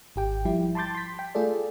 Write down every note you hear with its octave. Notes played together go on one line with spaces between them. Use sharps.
G#1 G4 G5
F3 G3 E4 G4
A5 B5 C6 D6 G6 A6
C6 B6
G5
A3 F4 G#4 A4 D5